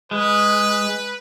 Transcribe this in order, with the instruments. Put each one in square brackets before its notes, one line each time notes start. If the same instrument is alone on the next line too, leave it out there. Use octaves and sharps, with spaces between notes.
[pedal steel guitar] G#3 [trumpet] B4